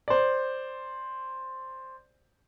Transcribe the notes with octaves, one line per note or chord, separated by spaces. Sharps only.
C5 D5